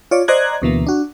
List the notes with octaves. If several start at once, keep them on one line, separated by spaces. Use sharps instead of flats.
F4 C#5 D5
C5 D5 D#5 A#5 F#6 G#6
D2 B2 E3 A#3
D4 F#4